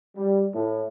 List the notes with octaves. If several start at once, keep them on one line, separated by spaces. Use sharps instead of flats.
G3
A2